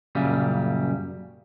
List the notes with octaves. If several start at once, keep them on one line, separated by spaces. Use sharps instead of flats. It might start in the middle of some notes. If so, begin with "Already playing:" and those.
F#2 A#2 C#3 G3